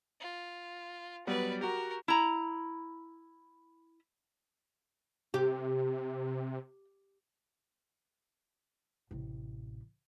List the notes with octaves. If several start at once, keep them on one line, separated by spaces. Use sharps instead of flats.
F4
F#3 G3 B3 B4 D5
F#4 G4 A#4
E4 A#5
C3 G4
A1 C3